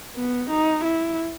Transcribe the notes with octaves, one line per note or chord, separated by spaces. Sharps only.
B3
D#4
E4